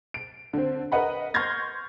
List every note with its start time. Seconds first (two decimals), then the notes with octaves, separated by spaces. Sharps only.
0.14 D7
0.53 D3 C4
0.92 A#4 B4 D#5 F#5 B5
1.34 C6 C#6 F6 G6 G#6 A#6